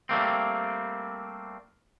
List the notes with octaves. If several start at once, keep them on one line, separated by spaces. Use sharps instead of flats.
G3 A3 A#3 C4